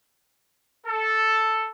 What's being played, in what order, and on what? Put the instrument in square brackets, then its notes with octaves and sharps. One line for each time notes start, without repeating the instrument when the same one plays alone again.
[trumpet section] A4